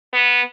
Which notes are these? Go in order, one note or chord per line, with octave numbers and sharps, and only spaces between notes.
B3